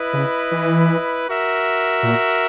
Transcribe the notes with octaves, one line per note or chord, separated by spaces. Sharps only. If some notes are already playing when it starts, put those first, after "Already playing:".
Already playing: E4 B4 D#5
C#3
E3
F#4 A#4 E5
A#2